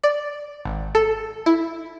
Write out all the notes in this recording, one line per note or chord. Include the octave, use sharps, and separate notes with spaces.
D5
G#1
A4
E4